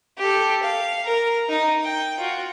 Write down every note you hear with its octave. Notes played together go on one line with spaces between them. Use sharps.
G4 A4
F5
A#4
D#4
G5
F4 F#4